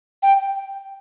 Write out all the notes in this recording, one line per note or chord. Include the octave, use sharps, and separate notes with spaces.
G5